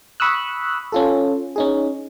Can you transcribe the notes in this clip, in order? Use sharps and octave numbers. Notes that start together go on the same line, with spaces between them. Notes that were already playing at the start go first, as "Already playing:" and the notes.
B5 C#6 D#6 E6 F#6
C#4 F4 A4
C#4 D#4 G#4